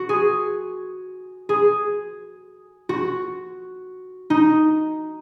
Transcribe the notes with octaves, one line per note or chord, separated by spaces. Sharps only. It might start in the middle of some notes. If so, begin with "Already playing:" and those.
Already playing: F#4
G#4
G#4
F#4
D#4